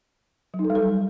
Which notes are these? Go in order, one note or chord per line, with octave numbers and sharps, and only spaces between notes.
F#3
D#4
A4
G3
A4